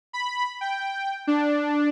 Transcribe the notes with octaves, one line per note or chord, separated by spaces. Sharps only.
B5
G5
D4